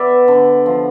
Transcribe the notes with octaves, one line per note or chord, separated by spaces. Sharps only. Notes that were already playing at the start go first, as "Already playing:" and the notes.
Already playing: B3 D5 E5
D3
F3